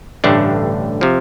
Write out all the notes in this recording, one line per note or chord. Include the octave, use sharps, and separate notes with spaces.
A1 G2 D3 A3 D4
C3 F3